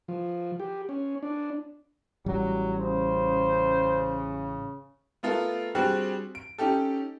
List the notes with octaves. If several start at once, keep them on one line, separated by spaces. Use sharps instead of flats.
F3
G4
C#4
D4
A1 F#3 G3
C#3 C5
A3 B3 F4 A4 A#4
G3 C4 D4 F#4 G#4
D7
C#4 D#4 G4 A4